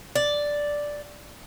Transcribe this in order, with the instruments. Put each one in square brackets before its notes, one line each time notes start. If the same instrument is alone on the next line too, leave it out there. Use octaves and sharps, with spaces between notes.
[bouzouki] D5